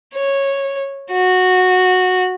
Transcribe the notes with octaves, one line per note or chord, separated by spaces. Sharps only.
C#5
F#4